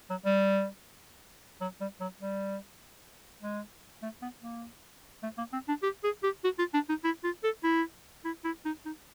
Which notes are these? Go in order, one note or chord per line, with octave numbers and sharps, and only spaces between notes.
F#3
G3
F#3
G3
F#3
G3
G#3
A3
B3
A#3
A3
A#3
C4
D4
G4
G#4
G4
F#4
F4
D4
D#4
E4
F4
A4
E4
E4
E4
D#4
D#4